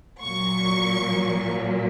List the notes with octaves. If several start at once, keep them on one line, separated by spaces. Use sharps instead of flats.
A#2 F#3 C#6